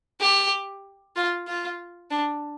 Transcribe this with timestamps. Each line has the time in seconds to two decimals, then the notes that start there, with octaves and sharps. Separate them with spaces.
0.20 G4
1.16 F4
1.48 F4
2.10 D4